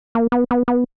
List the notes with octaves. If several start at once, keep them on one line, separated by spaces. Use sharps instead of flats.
A#3
B3
B3
B3